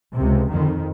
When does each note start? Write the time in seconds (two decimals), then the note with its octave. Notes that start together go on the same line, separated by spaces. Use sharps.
0.14 C#2 C3
0.50 F2 D#3